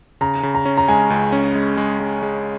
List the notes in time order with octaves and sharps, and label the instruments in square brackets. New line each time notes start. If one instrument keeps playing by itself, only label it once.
[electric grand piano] C#3 [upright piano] A#5
[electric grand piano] C#3
[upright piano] A#5
[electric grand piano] C#4
[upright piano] A#5
[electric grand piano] G#3 [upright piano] G#5
[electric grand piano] C#2
C#4
G#3
G#3
G#3
G#3